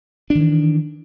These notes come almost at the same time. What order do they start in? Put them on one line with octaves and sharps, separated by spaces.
D4 D#3 E3